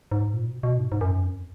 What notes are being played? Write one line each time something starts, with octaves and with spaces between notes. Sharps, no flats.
G#2
A#2
B2
B2
G#2
G#2
F#2
F2